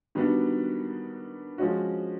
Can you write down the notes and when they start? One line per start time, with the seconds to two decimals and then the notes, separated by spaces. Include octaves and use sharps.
0.15 D#3 G3 B3 D4 F#4
1.58 F3 G#3 C#4 F#4